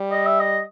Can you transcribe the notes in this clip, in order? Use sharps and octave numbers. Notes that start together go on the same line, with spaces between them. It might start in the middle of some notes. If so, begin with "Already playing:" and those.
Already playing: G3
D#5
E5
D#5